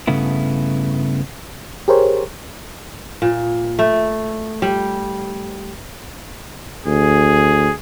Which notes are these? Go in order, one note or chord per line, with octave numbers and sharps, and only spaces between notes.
G2 C#3 A3 B3 E4
G4 G#4 A#4 C5 C#5
A#2
A3
G3
D2 G#4